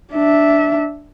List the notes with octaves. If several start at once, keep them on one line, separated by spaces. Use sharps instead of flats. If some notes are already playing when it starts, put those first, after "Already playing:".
D4 E5